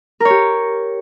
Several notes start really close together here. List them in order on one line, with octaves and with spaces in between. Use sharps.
A#4 C#5 G4